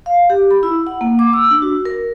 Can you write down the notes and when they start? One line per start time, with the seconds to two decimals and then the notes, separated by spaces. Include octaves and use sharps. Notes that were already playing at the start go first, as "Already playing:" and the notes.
0.06 F5
0.30 G4
0.51 B5
0.63 E4
0.87 F#5
1.01 A#3
1.19 D6
1.33 E6
1.51 D4
1.62 F#4
1.85 A#4